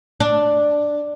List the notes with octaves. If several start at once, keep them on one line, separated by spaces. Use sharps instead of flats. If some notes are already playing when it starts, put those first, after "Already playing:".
D4